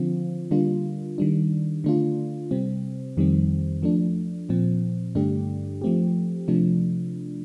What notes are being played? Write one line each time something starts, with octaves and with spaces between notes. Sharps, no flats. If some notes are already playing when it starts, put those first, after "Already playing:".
Already playing: D3 F3 C4 F4
D3 G3 A#3 D4 F4
D#3 G3 D4
D3 A3 D4 F4
C3 G3 C4
F2 D#3 G3 C4
F3 A3 D4
A#2 F3 C4
G2 D3 A3 D4 G4
F3 A3 C4 G4
C3 F3 A3 D4